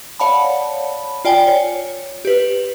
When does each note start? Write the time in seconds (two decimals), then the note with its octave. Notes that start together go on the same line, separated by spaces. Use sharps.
0.19 C#5 D5 F5 F#5 A5 B5
1.25 F4 D5 G5 G#5
1.47 C#5
2.25 G4 B4